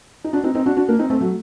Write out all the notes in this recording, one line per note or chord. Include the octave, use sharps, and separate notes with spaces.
D#4
D4 F#4
C4 D#4
C4 D#4
D4 F#4
D4 F#4
A#3 D4
C4 D#4
A3 C4
F#3 A3